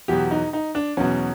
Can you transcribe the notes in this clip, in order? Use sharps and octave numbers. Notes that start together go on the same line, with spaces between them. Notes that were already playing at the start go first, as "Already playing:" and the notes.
E2 B2 F#3 G4
D#4
D#4
D4
E2 B2 F#3 C#4